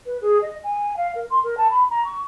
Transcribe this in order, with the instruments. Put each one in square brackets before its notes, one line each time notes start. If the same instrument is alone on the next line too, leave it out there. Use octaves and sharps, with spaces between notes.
[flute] B4
G#4
D#5
G#5
F5
A#4
C6
A#4
A5
B5
A#5
C#6